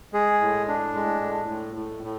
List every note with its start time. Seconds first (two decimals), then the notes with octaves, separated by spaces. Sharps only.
0.13 G#3 G#4
0.41 A2
0.68 D4
0.95 G#3
1.21 A2
1.49 A2
1.75 A2
2.03 A2